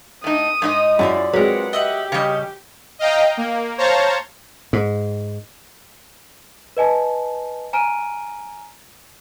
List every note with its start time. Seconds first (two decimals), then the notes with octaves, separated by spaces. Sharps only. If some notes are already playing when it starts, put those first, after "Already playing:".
0.24 A2 D#4 D#6
0.62 G#2 D#4 D#5
0.99 F#2 E4 F4 G#4 D5
1.33 F#3 G#3 C4 A#4 B4 F#5
1.73 G4 D#5 E5 F#5
2.12 C#3 G3 C#5 D#5
2.99 D#5 F5 G5 A#5
3.37 A#3
3.78 C5 C#5 F5 A5 A#5
4.73 G#2
6.77 B4 D#5 G#5 A5
7.73 G#5 A#5 F6 D7 D#7